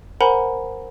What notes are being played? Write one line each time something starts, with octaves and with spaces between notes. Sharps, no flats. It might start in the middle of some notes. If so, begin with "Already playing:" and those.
A#4 C5 F#5 G#5 A#5 B5